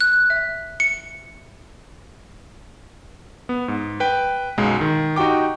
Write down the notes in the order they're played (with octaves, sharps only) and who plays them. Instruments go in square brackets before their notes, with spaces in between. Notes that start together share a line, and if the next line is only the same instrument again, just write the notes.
[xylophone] F#6
E5
C#7
[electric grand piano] B3
G#2
B4 G5
B1 F#2 F#3 G#3
D#3
D#4 F#4 G4 G5 D6